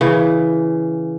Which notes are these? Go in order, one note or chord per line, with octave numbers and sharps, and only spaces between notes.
C#3 E3